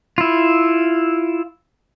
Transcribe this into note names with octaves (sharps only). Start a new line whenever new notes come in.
E4 F4